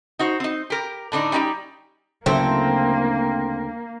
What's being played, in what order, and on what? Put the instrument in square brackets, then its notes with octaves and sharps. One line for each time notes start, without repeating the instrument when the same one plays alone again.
[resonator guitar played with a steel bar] D#4 F#4 C5
C4 D#4
G4 A#4
A2 D3 D4 D#4
G3 C#4 D#4 F#4 G4
[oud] D2 E4 A4 [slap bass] C#3 F#3 [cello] A#3 [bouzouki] C4